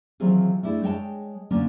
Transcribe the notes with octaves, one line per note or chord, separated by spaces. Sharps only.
D#3 E3 F#3 C4 F4 G#4
A3 D4 E4 G#4
G#3 C#5 G5 A5
D3 A#3 C#4 D4 F4